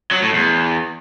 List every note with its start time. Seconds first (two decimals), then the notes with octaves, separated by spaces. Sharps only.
0.11 F#3
0.22 A2
0.33 E2